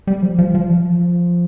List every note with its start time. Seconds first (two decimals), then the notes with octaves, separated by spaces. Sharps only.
0.07 G3
0.23 F3
0.39 F3
0.55 F3